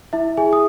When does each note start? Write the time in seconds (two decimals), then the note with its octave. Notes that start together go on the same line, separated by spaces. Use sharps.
0.13 E4 E5
0.37 G#4 G#5
0.53 D#6